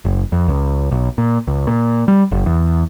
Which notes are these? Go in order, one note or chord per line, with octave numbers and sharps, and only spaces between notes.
F#1
F2
C#2
B1
A#2
C#2
A#2
G3
F#1
E2